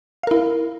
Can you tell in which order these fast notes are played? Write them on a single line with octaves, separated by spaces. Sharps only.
F5 A#4 E4